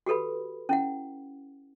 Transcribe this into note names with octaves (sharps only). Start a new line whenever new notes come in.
F#4 G4 A4 B4 B5
C#4 E4 F#5